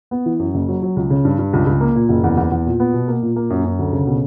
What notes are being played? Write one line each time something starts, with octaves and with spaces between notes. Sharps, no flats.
B3
E3
F#2
F#1
F#3
F#3
C#2
C#3
G2
G2
C#2
C#2
A#3
A#2
F#1
E2
E2
E2
A#2
B3
B2
A#3
A#2
A#3
F#2
F#2
D2
C#3
B2